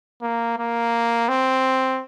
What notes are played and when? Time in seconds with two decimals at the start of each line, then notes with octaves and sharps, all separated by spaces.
0.22 A#3
0.58 A#3
1.28 C4